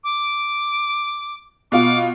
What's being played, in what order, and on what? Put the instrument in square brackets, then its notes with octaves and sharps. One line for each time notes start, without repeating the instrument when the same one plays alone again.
[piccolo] D6
[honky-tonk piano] B2 F4 [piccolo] D6